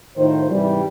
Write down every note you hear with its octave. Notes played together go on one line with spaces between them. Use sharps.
A2 D#3 F4 C5
G#2 C3 E3 G3